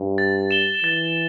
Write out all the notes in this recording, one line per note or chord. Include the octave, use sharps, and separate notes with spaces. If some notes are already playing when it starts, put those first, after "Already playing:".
Already playing: G2
A6
E7 G7
E3 A6